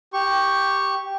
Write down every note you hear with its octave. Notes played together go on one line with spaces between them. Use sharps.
G4 C#6